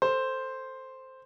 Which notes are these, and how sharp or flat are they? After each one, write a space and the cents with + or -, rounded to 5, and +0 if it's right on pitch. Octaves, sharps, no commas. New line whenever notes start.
A4 +15 C5 +0